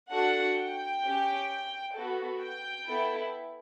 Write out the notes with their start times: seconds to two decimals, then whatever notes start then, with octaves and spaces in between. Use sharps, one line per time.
0.11 D4 F#4 A4 F#5
0.57 G5
1.03 C#4 G4
1.95 B3 F#4 A4
2.41 G5
2.87 B3 E4 A4